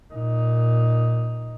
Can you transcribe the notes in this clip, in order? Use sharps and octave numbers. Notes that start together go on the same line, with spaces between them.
A#2 D#4